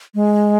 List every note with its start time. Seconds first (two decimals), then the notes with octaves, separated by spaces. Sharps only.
0.15 G#3